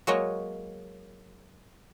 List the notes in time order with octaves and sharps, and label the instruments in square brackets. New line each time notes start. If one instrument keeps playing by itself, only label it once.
[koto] F#3 G#3 A#3 F#4 C#5 D#5